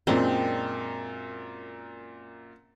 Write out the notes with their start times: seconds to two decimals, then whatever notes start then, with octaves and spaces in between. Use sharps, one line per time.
0.07 F#2 A#2 G#3 C4 D4